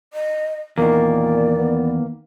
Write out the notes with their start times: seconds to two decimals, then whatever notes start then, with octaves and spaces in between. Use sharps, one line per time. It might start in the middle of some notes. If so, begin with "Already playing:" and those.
0.13 D#5
0.78 E2 A#2 D#3 A#3 D5
1.58 B3